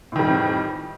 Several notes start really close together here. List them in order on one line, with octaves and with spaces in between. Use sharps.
A2 D#3 G3 E3 F2